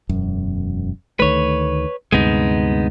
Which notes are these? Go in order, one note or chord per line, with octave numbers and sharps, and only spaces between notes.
E1 F#2
D2 D#3 A3 B4 C#5
D2 G2 C3 G#3 B3 D#4